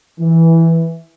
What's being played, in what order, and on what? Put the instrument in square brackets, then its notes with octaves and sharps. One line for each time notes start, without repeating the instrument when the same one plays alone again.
[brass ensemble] E3